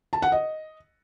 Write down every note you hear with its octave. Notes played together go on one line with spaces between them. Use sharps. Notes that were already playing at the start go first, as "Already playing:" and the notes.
A5
F#5
D#5